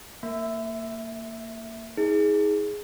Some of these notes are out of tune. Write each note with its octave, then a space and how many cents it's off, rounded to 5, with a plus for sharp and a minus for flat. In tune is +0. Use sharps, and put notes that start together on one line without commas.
A#3 -25 E5 +0
D#4 +45 G#4 +0